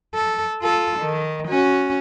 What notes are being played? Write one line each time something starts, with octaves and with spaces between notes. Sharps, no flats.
A4
F4 A4
D#3
C#4 F#4